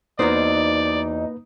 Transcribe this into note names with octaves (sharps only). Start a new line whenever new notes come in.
E2 A#3 D#4 F#4 B4 C5 D5